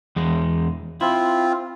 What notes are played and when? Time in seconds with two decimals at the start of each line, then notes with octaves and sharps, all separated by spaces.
0.16 E2 G#3
1.01 C4 E4 F4